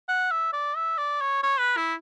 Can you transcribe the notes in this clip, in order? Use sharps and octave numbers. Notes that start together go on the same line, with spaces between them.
F#5
E5
D5
E5
D5
C#5
C#5
B4
E4